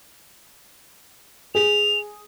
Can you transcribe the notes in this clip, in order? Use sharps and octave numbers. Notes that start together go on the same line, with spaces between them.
G#4 F7